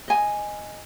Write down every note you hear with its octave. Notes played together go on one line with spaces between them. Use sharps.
D#5 G#5